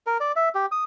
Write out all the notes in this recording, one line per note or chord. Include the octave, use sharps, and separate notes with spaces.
A#4
D5
E5
G4
D#6